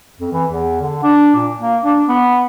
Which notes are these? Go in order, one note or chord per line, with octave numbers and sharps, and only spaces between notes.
F2
E3
E2
D3
D4
A#2
A#3
D4
B3